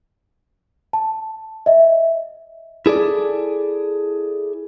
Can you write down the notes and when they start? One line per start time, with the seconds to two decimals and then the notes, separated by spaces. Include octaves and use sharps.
0.93 A5
1.66 D#5 E5
2.86 E4 G#4 A4 D5